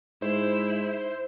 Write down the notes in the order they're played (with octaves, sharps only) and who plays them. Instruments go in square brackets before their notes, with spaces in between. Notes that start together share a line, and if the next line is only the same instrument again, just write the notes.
[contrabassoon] G#2 [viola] E4 [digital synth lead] C5